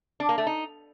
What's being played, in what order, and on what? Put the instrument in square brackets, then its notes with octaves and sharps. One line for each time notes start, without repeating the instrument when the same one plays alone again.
[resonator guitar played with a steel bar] D4
A#3
A3
D#4